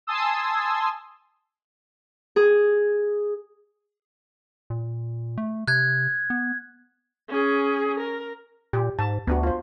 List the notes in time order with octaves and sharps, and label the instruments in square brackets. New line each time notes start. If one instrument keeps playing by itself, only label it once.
[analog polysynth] G#5 A5 C6 D#6 E6
[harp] G#4
[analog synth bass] A#2
A3
[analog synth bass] C3 [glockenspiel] F#6 G#6
[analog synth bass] B3
[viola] C#4 G#4
A#4
[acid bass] A#2 [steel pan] G4
[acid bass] G#2 [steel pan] A5
[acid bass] D2 [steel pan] B3 D4 F#4
[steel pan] F4 C5